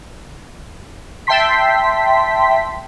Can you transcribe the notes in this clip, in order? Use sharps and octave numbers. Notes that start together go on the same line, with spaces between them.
E5 G5 A5 C6 B6